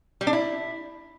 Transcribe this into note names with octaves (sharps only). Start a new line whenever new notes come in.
G3
D4
E4